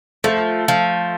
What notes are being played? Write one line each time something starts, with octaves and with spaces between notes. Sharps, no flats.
F3 A3
F3